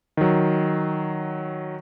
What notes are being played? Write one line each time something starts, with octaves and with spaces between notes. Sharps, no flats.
D#3 F#3